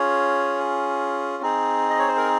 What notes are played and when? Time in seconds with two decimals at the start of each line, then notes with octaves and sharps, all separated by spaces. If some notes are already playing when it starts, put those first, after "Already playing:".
Already playing: C#4 F4 G#4 C#5
1.42 C4 D#4 G#4
1.90 D#5
1.99 C#5
2.08 C5
2.17 A#4